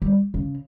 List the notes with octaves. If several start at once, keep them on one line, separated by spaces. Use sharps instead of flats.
G3
C#3